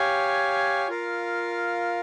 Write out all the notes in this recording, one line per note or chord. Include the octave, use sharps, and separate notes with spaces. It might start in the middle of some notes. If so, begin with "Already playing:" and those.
Already playing: G4 C#5 F5 G#5
F4 A#4 F5